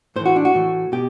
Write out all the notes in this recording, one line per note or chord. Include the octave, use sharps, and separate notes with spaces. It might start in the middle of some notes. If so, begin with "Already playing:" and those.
A2 E3 C5
F#4
D4
F#4
A2 E3
B2 G4